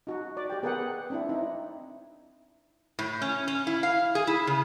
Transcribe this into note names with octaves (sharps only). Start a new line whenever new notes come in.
D#4 F#4
D5
G4 G5
B3 G#4 A#4 B4 F#5 G5
C4 D4 E4
D#4 E4
A2
C#4
C#4
E4
F5
G#4
E4
C#3